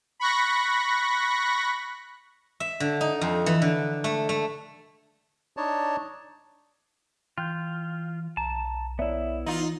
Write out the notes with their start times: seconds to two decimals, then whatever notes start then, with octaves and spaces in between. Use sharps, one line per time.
0.20 B5 C#6 F#6 A#6
2.60 E5
2.80 D3
3.01 D#4
3.21 F2
3.46 E3
3.62 D3
4.04 A3
4.29 A3
5.57 D4 D#4 C#5 A5
7.38 E3 F4 G5 F#6 G6
8.37 B1 A5 A#5
8.99 B3 E4 C#5 D5 E5
9.46 E3 D#4 F4 F#7